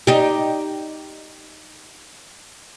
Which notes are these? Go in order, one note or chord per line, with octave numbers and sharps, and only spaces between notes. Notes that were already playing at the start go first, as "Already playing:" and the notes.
D#4 G4